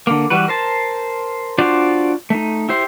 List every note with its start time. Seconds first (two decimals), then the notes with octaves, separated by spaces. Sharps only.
0.07 D3 A#3
0.30 E3 G3 F#4 B4
0.48 A#4 C5 A5
1.58 D4 F4 F#4 C5 D5
2.30 A3 D#4
2.69 E4 G4 C5